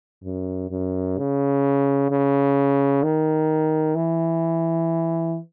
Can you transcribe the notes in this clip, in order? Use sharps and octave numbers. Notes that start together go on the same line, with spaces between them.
F#2
F#2
C#3
C#3
D#3
E3